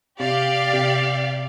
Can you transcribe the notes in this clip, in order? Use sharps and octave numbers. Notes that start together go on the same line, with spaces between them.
C3 G4 D5 F5
C3